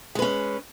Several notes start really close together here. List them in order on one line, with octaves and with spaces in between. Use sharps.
G#3 B4 C#4